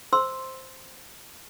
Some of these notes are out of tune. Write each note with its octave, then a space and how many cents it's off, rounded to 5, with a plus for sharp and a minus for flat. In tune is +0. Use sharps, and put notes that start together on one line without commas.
C5 +0 C6 +0 E6 -5